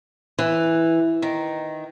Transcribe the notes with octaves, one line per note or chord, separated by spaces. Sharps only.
E3
D#3